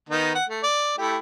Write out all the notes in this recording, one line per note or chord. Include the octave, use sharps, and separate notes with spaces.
D#3 B3 D#4
F#5
A3
D5
A3 E4 G4